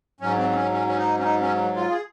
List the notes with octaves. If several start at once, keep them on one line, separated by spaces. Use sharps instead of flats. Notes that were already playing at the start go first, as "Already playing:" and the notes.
G#2 F#3 C#4
C4
C4
C#4
C#4
C#4
D#4
C#4
D#4
C#4
F4
G#4